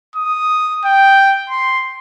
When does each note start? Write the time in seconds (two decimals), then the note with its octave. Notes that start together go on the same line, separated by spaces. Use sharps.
0.16 D#6
0.85 G5
1.49 C6